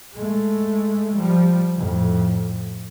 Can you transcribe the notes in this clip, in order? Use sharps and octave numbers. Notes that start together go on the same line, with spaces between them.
G#3 A3
F3 G3
F2 A2